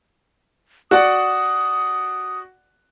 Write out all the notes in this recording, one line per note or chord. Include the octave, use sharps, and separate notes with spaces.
F#4 D5 F#5 D#6